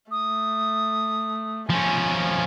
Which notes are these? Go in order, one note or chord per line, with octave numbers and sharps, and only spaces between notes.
A3 D#6
F3 C#4 G#5